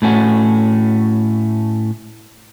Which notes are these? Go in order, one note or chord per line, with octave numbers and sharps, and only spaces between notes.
A2 A3 C#4 F#4